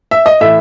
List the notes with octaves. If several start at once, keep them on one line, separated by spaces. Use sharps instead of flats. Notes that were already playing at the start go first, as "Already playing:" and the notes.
E5
D#5
A2 E3 E5